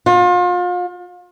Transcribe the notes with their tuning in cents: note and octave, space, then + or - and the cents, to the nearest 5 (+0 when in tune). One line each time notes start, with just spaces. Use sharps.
F4 +35